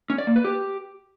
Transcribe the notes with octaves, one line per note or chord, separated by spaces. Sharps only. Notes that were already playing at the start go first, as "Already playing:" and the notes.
C#4
D5
A#3
B4
G4